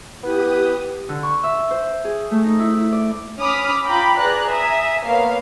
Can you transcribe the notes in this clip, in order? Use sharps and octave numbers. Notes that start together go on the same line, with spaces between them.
B3 E4 G4 B4 D#6
D3
C#6
E5
C5
G#4
A3
D#4
E4
E4
D5
C#4 B5 D6 D#6 F6 B6
F4 G5 A#5 B5 D6
G#4 B4 D5 A#5 F#6
E5 G#5 A#5 D#6
A#3 B3 A#4 C#5 F5 C7